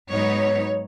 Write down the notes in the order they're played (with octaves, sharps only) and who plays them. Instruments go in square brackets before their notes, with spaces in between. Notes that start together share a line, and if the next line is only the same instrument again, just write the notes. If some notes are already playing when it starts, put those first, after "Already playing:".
[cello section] G#2 F#3 B3 D#4 C#5